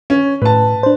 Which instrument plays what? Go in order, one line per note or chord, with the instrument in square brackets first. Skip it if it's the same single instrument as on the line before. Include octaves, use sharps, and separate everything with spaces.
[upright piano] C#4
[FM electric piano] A2 [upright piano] B4 A5
[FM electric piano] D4 C5